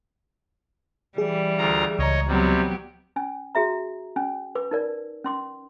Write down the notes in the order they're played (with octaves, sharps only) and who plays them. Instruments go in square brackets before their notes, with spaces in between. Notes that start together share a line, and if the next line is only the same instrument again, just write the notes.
[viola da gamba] E3 G3 [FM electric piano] G#4
[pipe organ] D2 F4 A#5
[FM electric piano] C#2 A#5 [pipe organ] C#5 D#5
[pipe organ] C3 G3 [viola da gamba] F#3 B3 G4
[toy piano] C#4 G#5
F#4 G#4 E5 A#5
C#4 G#5
B4 D6
D#4 A#4 D5
C#4 C6 D6